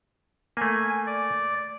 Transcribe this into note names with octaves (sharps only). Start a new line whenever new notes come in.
A3 A#3 G#5
D5